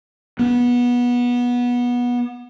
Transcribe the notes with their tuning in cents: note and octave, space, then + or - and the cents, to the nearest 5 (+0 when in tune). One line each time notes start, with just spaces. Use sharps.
B3 -20